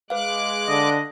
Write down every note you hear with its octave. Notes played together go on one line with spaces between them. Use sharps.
G#3 B4 F5 D6 F#6
D3 D#5